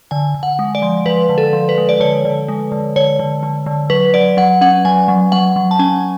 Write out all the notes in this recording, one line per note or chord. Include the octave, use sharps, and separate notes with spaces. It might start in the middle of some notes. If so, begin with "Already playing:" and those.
D3 G#5
D3
F#5
G#3
D5
F3
F3 B4
D3
A4
F3
B4
G#3
D5
D3 C#5
D3
G#3
D3
D3 C#5
D3
D3
D3
F#3 B4
F#3 D5
F#3 F#5
C#4 F#5
F#3 G#5
F#3
F#3 F#5
F#3
A5
C#4 G#5